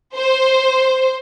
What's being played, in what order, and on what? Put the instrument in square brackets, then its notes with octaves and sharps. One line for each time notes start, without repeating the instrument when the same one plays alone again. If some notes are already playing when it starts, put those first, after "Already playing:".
[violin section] C5